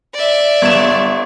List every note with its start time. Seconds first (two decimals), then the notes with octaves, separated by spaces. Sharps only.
0.14 D5 E5
0.62 G1 E7